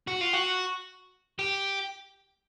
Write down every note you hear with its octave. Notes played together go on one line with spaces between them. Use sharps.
F#4
F4
F#4
G4